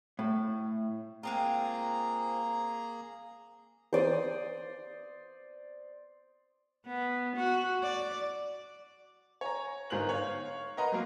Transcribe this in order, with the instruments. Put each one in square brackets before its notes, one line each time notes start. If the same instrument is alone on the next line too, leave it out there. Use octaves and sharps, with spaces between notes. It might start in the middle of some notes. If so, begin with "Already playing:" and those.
[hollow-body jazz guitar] A2
[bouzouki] G#3 C4 F4 [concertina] A#3 G#4 A#5
[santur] C5 D5 D#6
[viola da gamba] B3
F#4
D5
[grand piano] C#5 G#5 A#5
G1 G#2 A#4 C5 F#6 F#7
C#5 F5
A#4 B4 D#5 F#5 A#5 C6
F#3 A#3